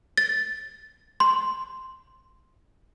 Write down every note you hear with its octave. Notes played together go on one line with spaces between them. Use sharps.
A6
C6